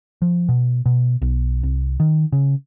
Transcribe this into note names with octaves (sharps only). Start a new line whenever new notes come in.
F3
B2
B2
B1
C2
D#3
C#3